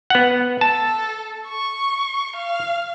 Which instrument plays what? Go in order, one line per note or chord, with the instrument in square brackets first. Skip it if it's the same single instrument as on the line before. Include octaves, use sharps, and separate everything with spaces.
[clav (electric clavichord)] B3 F#5
[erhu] A4 [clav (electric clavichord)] A5
[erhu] C#6
F5